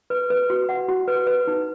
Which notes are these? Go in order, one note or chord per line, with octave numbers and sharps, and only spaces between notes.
B4
B4
F#4
F#5
F#4
B4
B4
D#4